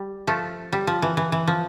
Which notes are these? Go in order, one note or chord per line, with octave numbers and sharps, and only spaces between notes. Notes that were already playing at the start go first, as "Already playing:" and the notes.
Already playing: G3
F3 A3
G3
F3
E3
E3
E3
F3